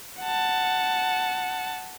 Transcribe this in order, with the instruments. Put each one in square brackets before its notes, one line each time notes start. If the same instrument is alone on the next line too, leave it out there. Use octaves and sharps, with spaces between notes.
[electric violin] F#5 A5